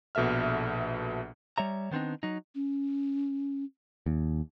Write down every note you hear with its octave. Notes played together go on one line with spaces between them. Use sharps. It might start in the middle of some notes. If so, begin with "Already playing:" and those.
A#1 B2 A4 E5 F6
G3 C#5 E5 A#5
D#3 B3 C4 D4 D#4
F#3 D#4
C#4
D#2